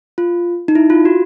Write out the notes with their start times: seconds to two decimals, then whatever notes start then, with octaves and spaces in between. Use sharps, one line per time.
0.18 F4
0.68 D#4
0.75 E4
0.90 F4
1.05 F#4